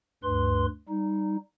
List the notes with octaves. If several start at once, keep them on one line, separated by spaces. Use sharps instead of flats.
D2 G2 B4 C6
G3 D#4